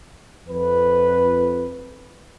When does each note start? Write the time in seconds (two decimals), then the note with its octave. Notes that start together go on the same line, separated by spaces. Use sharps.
0.48 F2 B4